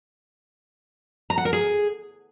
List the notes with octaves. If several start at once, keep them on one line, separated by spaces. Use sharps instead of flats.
A#5
F#5
A#4
G#4